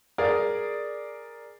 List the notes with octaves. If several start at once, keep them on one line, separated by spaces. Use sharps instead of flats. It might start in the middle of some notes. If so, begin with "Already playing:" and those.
G#4 A#4 D5